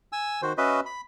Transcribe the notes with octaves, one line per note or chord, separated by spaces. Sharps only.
G#5 E6
D#3 F#4 C5
C#4 F#4 B4 D#5 E5
B5